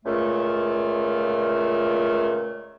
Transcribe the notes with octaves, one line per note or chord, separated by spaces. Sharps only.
C#2 A#2 A3